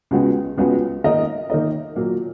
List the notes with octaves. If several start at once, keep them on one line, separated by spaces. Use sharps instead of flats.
C#2 C#3 G#3 B3 F#4
C#2 C#3 G#3 B3 F#4
D#3 A#3 D#4 A#4 D#5
D#3 A#3 D#4 A#4 D#5
A#2 F#3 A#3